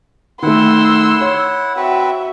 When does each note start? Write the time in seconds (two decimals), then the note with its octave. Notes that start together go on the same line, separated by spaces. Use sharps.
0.42 D#3 A3 E4 F#5 C6 E6
1.21 C#5
1.77 C4 F#4 B4 E5